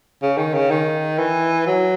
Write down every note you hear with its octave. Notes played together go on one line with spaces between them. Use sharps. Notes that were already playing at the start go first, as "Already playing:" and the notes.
C#3
D#3
C#3
D#3
E3
F#3